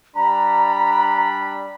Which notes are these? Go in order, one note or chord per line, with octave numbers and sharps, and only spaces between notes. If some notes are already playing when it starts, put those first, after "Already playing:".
G3 D4 A#5 B5